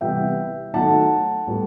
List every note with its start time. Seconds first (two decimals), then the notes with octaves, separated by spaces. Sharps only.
0.01 C3 E3 G3 B3 E5 G5
0.74 D#3 F#3 A3 F#5 A5
1.47 A2 G3 B3